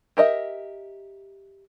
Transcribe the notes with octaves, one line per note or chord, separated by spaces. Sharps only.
G4 A#4 D#5 E5